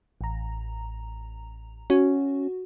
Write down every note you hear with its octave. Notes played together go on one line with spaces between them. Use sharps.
A1 A#5
C#4 F#4